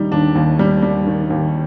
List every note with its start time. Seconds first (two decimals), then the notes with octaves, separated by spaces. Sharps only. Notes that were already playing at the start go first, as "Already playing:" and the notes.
Already playing: D#2 D#3 G3 D#4
0.12 D#2 D4
0.35 D#2
0.59 G3
0.82 G3
1.06 D#3
1.30 D#2